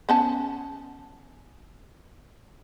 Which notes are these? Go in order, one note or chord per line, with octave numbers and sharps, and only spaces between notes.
B3 C#4 A5